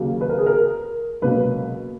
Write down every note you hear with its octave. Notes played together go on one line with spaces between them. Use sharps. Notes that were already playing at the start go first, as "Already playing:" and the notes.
Already playing: D#2 C#3 F#3 A#3
B4
A#4
G#4
A#4
C#2 B2 F#3 A#3 B4